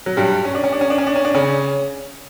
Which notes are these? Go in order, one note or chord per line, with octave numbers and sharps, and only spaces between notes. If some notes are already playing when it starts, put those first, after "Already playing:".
F#3
G2 G3
C#4
D4
C#4
D4
C#4
D4
C#4
D4
C#4
D4
C#3 C#4